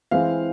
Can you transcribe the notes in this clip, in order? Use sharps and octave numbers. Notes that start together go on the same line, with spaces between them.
E3 G#3 C4 F5